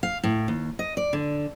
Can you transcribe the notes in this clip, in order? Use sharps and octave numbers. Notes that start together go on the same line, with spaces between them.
F5
A2
D#2
D#5
D5
D3